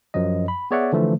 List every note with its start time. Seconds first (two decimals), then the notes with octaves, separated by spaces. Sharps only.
0.14 F#2 F3 F#3 D#5
0.48 B5
0.71 B3 G#4 C#5 D5 E5 F#5
0.92 D3 E3 F3 A3